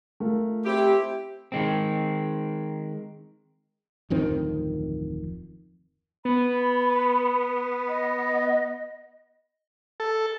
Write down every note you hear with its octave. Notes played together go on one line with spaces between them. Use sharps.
A3 F4 A#4
C4 E4 G4
D#3 G#3 C4
D1 F2 D#3 C4
B3 B5
D#5
A4